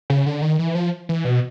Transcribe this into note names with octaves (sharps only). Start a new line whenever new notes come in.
C#3
D3
D#3
E3
F3
E3
B2